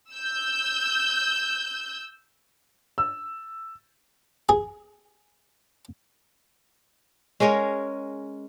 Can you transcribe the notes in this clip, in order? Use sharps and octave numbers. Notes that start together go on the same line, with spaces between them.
E6 G6
E6
G#4
G#3 C#4 A#4 C#5